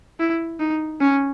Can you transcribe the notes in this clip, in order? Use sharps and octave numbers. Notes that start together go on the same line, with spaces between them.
E4
D#4
C#4